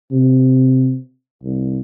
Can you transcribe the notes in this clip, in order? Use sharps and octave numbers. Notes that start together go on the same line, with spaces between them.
C3
C2